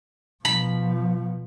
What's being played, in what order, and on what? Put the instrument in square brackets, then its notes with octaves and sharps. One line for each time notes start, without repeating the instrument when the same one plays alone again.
[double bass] B2 F3 [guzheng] B5